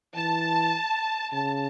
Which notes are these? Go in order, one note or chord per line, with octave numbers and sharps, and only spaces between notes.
E3 A5
C#3 A5